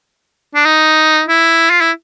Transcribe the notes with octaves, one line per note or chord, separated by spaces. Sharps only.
D4
D#4
E4
F4
E4